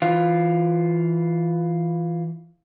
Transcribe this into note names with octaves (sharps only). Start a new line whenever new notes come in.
E3 F4